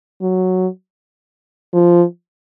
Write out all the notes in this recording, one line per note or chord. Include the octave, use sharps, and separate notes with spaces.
F#3
F3